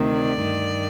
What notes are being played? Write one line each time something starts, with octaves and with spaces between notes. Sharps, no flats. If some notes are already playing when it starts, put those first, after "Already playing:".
Already playing: D2 C3 D#3
D5
G2 D#3